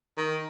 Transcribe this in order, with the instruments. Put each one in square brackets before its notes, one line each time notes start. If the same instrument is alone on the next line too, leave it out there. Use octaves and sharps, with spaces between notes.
[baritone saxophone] D#3